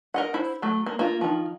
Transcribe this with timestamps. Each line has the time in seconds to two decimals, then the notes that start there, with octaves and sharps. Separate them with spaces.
0.14 A#4 D#5 F#5
0.34 E4 C5
0.62 F#3 A3
0.86 A#3
0.99 A#3 F4
1.21 D#3 F3